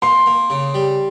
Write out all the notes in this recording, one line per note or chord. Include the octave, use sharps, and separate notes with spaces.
A#3 C6
A#3
C#3
G3